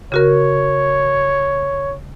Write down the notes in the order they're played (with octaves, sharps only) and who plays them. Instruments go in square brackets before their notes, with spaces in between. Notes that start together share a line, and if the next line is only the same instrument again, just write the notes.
[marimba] C#3 F#4 A#4 [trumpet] C#5